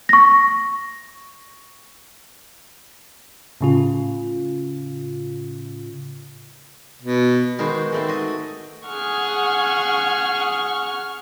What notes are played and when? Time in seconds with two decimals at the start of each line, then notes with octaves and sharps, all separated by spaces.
0.09 C#6 A#6
3.61 A2 C#3 F4
7.02 B2
7.59 D#3 G#3 F#4 B4 C5
7.92 G#3 A3 C4
8.08 F#4 D#5
8.87 G#4 F#5 C#6 F6